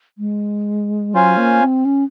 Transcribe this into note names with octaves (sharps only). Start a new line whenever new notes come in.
G#3
F#3 C#4 F4 C5 F5 G#5
A#3
C4
C#4